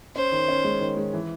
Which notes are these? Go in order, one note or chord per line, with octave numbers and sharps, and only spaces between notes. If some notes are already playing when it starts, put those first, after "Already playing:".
C#4 C5
D#3
C#4
G#3
D#3
G#3
E3